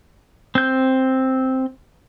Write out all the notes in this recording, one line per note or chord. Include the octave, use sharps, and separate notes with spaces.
C4 G6